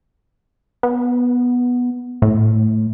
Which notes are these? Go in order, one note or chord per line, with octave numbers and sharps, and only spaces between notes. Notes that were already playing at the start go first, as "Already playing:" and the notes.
B3
A2